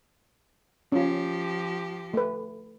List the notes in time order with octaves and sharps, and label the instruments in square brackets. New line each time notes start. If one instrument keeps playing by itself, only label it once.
[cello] F3 G4 [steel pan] C#4 F4
[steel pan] A3 B4